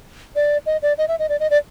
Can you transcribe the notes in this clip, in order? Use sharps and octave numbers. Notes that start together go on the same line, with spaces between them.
D5
D#5
D5
D#5
E5
D#5
D5
D#5
D5